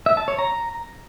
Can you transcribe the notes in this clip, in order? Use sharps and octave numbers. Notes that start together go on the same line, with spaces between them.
E5
A5
C#5
A#5